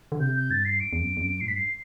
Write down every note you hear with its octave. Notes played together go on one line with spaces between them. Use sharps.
D3
C3 G6
G6
G2 A6
C7
D7
E2
F#2
E2
F#2
A2 C7
G2 B6
C7